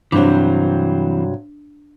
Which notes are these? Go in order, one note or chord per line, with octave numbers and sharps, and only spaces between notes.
G2 C3 E3 F#3 C4 D4